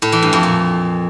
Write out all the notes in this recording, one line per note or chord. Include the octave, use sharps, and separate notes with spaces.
A2
E3
G2
F2
A#2